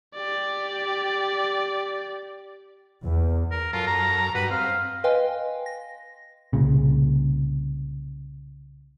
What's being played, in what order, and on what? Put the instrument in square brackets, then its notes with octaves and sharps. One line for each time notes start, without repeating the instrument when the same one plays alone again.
[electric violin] G4 D5
[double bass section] E2
[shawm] A#4
[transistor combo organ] F#2 A4 A#4 [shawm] F4
[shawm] A#5
[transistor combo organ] G2 F#4 [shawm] B4
[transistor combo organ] C4 [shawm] F5
[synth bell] B4 D#5 F5 G5 G#5 C6
A#6
[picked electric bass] C2 A#2 C#3